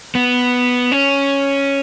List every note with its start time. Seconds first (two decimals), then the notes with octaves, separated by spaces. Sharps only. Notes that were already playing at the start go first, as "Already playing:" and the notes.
0.15 B3
0.92 C#4